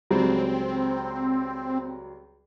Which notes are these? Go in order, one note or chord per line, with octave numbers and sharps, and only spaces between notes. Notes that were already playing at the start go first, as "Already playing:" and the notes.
C#2 F#3 G3 C4